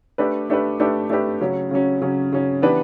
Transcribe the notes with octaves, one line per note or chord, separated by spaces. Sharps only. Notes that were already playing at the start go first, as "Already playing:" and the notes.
A3 D4 G4 B4
A3 D4 G4 B4
A3 D4 G4 B4
A3 D4 G4 B4
C#3 F#3 C#4
C#3 F#3 C#4
C#3 F#3 C#4
C#3 F#3 C#4
E3 B3 D4 G4 B4